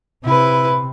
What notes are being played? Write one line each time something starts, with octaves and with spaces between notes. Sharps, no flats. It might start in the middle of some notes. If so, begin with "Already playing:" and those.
C3 E4 B4